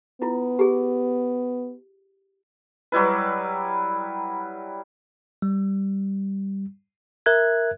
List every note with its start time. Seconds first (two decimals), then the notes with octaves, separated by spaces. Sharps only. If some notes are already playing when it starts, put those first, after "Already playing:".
0.22 B3 E4 F4
0.59 G4 G#4
2.92 F#3 G3 E4 B4
5.42 G3
7.26 A#4 E5 F#6 G#6